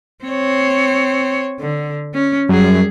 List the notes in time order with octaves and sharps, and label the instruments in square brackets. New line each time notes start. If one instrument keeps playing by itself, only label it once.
[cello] C4 C#5
D3
C#4
[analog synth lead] F#2 [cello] G3 G#4